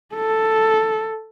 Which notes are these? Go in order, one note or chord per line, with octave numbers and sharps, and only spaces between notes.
A4